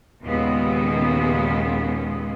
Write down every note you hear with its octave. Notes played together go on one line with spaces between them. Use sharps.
D#2 A#2 C#3 G#3 B3